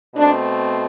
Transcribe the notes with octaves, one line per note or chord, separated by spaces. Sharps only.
B2 A3 C4 D4